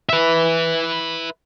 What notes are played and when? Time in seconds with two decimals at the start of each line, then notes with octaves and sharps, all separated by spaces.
0.09 B4 E5